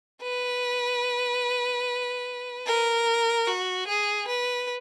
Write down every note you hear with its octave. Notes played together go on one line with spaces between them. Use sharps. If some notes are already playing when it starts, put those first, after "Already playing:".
B4
A#4
F#4
G#4
B4